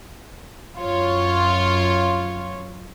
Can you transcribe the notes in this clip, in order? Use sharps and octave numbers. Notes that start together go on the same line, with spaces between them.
F#2 F4 C#5